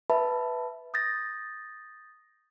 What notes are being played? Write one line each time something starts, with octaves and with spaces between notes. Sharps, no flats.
B4 E5 A5 B5
D#6 G6 A6 A#6